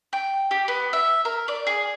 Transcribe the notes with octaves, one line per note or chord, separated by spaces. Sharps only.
G5
G4
B3
E5
A#4
D5
G#4